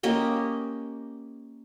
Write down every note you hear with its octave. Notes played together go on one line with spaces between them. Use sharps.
A#3 C#4 G4 D#5